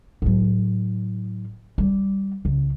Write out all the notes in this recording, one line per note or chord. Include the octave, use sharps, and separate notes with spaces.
A2 F#3
G3
C#2